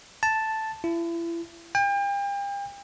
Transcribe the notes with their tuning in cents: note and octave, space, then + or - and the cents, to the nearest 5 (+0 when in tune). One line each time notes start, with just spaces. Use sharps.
A5 +0
E4 +35
G5 +40